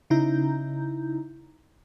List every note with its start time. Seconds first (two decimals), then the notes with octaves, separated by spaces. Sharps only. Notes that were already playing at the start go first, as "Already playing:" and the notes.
0.10 C#3 D#4 E4 A#5 G6